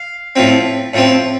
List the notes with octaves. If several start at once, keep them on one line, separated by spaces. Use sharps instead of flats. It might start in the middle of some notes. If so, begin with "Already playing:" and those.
Already playing: F5
A2 F3 C4
A2 F3 C4